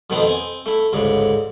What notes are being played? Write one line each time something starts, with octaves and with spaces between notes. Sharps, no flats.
F2 B2 D#3 A3 B3 C4
C4 G#5
A3 E4
A1 D2 G#2 C#3